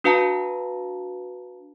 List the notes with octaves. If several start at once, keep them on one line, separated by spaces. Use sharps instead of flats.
D4 F#4 B4 F5 A5 A#5